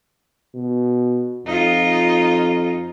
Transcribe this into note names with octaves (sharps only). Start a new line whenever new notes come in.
B2
F2 D#4 F4